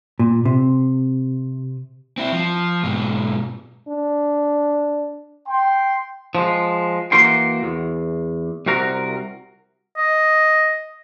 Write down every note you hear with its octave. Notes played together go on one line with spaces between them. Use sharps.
A#2
C3
C4 E4
F3
G#2 B2
D4
G5 C6
F3 G#3
E3 A#3 F#4 A#4 G5 C6
E2
C2 C3 F#4 A#4 A#5
D#5